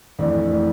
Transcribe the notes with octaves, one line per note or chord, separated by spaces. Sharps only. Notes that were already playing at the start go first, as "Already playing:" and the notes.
F2 E3 A3 D4
E3 A3 D4